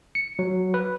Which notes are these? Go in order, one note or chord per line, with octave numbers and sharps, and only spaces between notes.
C#7
F#3
B4